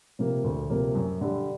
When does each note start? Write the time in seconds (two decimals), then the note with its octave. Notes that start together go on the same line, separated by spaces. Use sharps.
0.19 C3 F3 A#3
0.44 D2
0.70 C3 F3 A#3
0.95 F#2
1.21 D3 G3